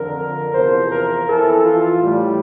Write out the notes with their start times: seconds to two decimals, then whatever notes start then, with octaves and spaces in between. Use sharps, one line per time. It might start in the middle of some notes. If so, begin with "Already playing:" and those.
Already playing: F2 D3 F3 A#4
0.52 E2 C3 F3 C5
0.90 A#4
1.27 F2 E3 A4
1.64 F4
2.01 A2 E3 G3